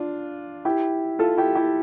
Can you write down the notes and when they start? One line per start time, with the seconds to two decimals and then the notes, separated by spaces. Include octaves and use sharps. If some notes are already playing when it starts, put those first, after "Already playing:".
Already playing: D4 F4
0.65 E4 G4
1.19 F4 A4
1.38 E4 G4
1.55 E4 G4